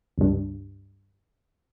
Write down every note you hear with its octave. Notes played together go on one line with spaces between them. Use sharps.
C#2 G2